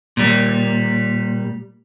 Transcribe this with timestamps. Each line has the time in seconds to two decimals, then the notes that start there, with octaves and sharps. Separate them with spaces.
0.17 A#2 G3